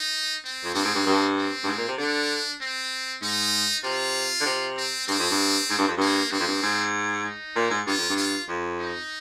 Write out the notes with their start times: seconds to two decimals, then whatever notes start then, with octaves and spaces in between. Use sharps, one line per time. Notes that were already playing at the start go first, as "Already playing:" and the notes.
Already playing: D#4
0.44 C4
0.64 F2
0.74 G2 C4
0.85 G#2
0.95 G2
1.06 G2
1.36 C4
1.64 G2
1.67 G#2
1.78 A#2
1.88 C3
1.98 D3 D4
2.61 C4
3.22 G#2 D#4
3.84 C3 F4
4.40 D3
4.46 C3
4.77 C4
5.07 G2 C4
5.19 F2
5.30 G2
5.70 G#2
5.78 G2
5.88 F2
5.97 G2 A#3
6.31 G2 C4
6.40 F2
6.47 G2
6.62 G#2
7.24 D#4
7.56 A#2
7.70 G#2
7.86 G2 F4
7.98 F2
8.09 G2
8.17 F4
8.48 F2
8.79 D#4